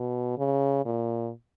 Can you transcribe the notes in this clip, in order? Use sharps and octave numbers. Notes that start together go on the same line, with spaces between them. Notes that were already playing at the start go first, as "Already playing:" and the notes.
Already playing: B2
C#3
A#2